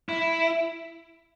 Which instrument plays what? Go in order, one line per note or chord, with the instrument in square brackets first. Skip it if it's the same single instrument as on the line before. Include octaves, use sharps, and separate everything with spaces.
[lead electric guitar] E4